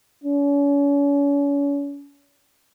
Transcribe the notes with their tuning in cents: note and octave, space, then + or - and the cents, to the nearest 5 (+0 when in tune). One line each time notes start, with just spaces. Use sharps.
C#4 +40